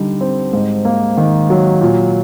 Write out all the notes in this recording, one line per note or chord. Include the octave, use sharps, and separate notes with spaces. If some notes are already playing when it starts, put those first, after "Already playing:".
Already playing: D3 G3 D#4
C4
G#2
A#3
D#3
F#3
A#2